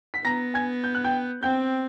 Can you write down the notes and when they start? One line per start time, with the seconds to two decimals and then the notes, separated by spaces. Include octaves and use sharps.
0.14 B6
0.24 B3 A#5 A#6
0.54 G#5 G#6
0.84 G6
0.95 F#6
1.05 G5 G6
1.43 C4 G5 G6